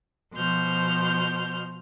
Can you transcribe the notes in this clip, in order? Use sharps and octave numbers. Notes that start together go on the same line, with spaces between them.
B2 F3 C5 F6 G6